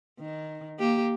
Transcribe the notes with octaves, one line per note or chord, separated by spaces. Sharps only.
D#3
A#3 G4